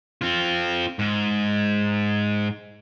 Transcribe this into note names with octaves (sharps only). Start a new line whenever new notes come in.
C4 F4
G#2